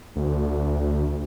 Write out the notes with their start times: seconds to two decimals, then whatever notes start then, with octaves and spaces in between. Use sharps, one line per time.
0.16 D2